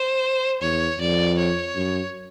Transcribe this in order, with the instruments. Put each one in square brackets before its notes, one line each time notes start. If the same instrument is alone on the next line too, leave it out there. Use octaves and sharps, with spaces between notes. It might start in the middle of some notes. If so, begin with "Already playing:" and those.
Already playing: [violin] C5
[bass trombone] E2 [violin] C#5
[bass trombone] F2 [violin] D5
[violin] C#5
[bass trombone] F#2